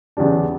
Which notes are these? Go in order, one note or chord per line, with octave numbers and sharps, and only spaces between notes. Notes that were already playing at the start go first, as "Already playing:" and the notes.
E2 C#3 G3 D4